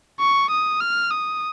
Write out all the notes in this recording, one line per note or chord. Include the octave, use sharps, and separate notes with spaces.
C#6
D#6
F6
D#6